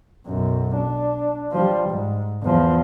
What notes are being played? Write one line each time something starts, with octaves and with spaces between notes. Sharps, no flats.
B1 F#2
D4
F3 G3
G#2
E2 F3